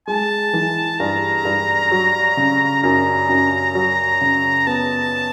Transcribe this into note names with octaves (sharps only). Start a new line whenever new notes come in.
G#3 A5
E3
G2 A#5
G2
F#3
C#3
F#2 A#5
F#2
F#3
C#3
B3 A5